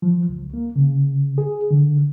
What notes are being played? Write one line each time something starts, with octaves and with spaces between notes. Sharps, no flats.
F3
C#2
A#3
C#3
G#4
D3